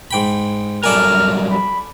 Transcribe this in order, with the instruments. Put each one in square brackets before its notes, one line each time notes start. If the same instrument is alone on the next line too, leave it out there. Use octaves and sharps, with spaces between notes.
[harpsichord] G#2 G5 B5
[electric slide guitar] F#3 G3 A#4 [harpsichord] A4 D5 G#5 [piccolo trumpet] F6
[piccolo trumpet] B5